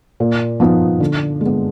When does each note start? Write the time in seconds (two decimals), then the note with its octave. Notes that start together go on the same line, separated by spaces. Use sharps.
0.20 A#2
0.60 F3 B3 D#4
1.00 D3
1.41 G#3
1.46 B3